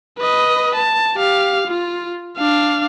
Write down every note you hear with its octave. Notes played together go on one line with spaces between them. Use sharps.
B4 D#5
A5
G4 F5
F4
D4 F5